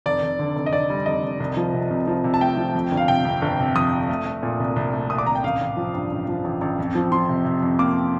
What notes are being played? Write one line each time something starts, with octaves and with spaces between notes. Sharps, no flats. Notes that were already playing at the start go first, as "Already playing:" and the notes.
F1 D5
F1
D3
F1
D#5
F1 D5
G3
F1 D#5
F1
C2
F3
C3
C2
F3
C3
A5
A3 G5
F3
F2
G1
F5
C3 G5
F2
G1
C3
F2 D#6
F2
A3
A3
A#2
C2
C2
A3
A#2 D#6
D6
C2 A#5
G5
A1 F5
A1
F3
G2
A1
F3
A1
A1
F2
F3
F3 C6
C3
C3
F2
A#3 D6